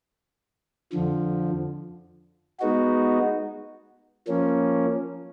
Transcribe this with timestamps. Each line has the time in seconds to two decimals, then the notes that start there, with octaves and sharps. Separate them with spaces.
0.92 F2 D3 F3
2.59 G#3 B3 D#4 F#4
4.27 F3 A#3 C#4